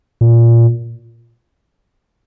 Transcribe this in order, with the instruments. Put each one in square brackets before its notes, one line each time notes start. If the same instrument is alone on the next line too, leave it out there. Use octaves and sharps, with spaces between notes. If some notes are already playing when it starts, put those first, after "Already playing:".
[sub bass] A#2